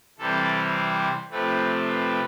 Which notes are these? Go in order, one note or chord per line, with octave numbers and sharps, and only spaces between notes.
C3 E3 G3 C4 A4
C5
C3 F3 A3 C4 B4
B4